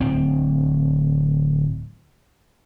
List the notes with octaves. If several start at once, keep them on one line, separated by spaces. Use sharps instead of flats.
D1 C4